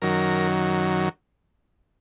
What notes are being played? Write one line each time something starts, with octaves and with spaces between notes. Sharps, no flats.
F#2 D#3 F#3 A#4